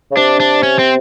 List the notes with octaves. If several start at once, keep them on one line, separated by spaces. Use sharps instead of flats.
C#3
C3 D4
D4
C#4
C4